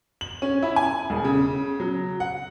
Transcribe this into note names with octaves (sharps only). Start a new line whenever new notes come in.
F#7
C#4
E4
G#5
E1
C#3
F#3
F#5